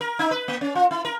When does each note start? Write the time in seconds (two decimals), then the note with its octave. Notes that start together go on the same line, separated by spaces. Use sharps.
0.01 A#4
0.19 D#4
0.31 B4
0.48 A#3
0.61 C#4
0.75 F4
0.91 E4
1.05 A#4